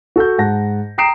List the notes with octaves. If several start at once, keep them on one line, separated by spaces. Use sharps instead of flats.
F#4 A4 F#5 G6
G#2 F#5 A5 A#6
G5 A#5 D#6 C7 D7 E7